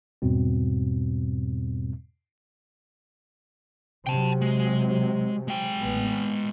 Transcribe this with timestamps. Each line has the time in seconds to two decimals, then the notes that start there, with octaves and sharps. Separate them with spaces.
0.22 E2 G#2 B2 G3 C4
4.07 C3 F#3 G5 A5
4.42 G#3
5.48 G#3 G5
5.80 A1 B3
6.17 A#2